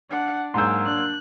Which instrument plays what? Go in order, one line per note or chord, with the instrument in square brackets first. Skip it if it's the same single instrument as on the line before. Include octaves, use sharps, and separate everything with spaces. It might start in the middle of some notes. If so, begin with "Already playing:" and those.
[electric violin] D4 [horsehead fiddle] F#5
[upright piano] G#2 G#4 G6 [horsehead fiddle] F#3 A#3 [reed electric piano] C6 E6
[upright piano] D4 [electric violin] F#6